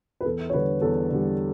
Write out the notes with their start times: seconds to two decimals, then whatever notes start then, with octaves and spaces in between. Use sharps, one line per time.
0.21 B4
0.25 E2 A4
0.50 C#5
0.53 D3 G3 B4
0.82 E2 A4
1.10 D3 G3